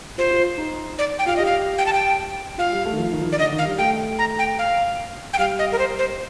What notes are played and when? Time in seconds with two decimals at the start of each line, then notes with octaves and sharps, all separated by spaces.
0.18 F4 C5
0.31 F4
0.58 D#4
0.99 D5
1.19 G5
1.26 F4 F5
1.36 G4 D#5
1.45 F5
1.78 G5
1.86 A5
1.93 G5
2.58 F4 F5
2.72 G3
2.86 A3
2.92 D#3
2.98 F3
3.12 D#3
3.21 F3
3.25 D#3
3.32 D5
3.39 D3 D#5
3.52 D#3
3.58 F5
3.65 G3
3.78 A3 G5
4.19 A#5
4.39 G5
4.59 F5
5.33 G5
5.38 G3 F5
5.59 D#5
5.72 A#4
5.79 C5
5.99 C5